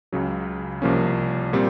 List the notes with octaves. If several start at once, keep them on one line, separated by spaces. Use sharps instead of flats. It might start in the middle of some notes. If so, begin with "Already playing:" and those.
C#2 C#3 F#3
C2 C3 F3 A#3 C#4
A#2 G3 C4